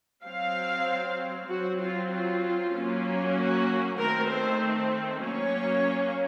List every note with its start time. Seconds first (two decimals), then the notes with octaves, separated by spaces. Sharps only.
0.24 F#3 C4 F5
1.48 F#3 C4 F#4
1.80 F4
2.11 F4
2.74 F#3 A#3 C#4
3.36 F#4
3.98 D#3 A3 C4 A#4
4.29 C5
5.23 F#3 A#3 C#4 C#5